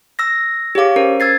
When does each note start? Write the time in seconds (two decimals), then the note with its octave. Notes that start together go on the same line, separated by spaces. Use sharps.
0.19 E6 A#6
0.75 G4 G#4 C#5 F5 D6
0.96 C#4 A#4 C5
1.20 E6 G#6 A6 C7